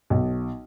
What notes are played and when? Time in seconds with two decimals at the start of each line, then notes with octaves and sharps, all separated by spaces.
0.10 B1